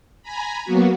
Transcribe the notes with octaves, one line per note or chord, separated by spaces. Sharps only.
G#5 A#5 B5
F#3 A#3 B3 F#4